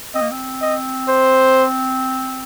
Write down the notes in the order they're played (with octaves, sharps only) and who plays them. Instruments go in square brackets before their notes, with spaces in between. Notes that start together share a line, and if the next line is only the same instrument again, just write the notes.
[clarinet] C4 [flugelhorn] D#5
[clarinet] A#3
C4
[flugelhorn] D#5
C5